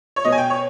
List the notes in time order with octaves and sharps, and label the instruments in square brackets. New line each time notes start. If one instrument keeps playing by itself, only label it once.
[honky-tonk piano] C#5
B2 D#5
G#5
G5
C#5